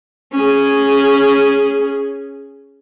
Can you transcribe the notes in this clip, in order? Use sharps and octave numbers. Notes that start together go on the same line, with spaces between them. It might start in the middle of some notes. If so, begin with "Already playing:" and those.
C#4 G#4